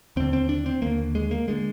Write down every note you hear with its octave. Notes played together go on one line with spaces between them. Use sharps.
D#2 D3 C4
C4
D4
C4
D#2 D3 A#3
G#3
A#3
D3 G#3